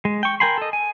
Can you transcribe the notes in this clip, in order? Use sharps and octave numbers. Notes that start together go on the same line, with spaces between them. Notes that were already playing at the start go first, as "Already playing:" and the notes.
G#3
G5 C#6
A#4 G5 G#5 B5 C6
A4 D#5
G#5